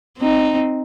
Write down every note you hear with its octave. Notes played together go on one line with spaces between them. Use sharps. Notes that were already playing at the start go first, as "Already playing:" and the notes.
C4 D#4